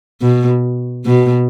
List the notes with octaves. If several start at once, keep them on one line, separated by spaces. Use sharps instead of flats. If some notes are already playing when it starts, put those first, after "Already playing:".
B2
B2